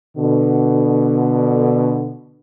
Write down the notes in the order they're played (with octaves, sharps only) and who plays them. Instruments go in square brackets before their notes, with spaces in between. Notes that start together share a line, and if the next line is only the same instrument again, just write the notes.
[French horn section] B2 D3